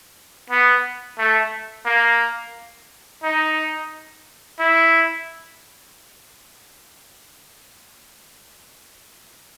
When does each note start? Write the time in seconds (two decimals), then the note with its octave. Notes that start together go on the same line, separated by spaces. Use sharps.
0.50 B3
1.18 A3
1.86 A#3
3.23 D#4
4.59 E4